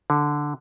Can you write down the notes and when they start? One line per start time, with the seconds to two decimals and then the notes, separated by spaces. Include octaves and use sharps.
0.10 D3